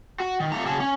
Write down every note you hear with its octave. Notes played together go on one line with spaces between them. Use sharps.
F#4
D#3
F2 A3 A#5
C#3 F#4 G#4 A5
C#4